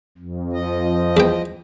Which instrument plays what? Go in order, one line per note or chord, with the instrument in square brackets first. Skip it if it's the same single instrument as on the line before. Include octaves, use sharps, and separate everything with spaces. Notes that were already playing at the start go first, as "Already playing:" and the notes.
[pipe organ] F2
[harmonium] F3 D#5
[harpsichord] E2 G5